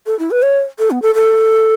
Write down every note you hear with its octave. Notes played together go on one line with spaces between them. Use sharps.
A4
E4
B4
C#5
A4
B3
A4
A4